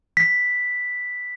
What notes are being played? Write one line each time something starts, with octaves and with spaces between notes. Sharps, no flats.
B6